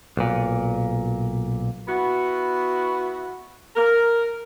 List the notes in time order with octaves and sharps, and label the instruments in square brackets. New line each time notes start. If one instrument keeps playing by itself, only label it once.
[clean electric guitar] B1 A#2
[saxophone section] B3 E4 F#4
A#4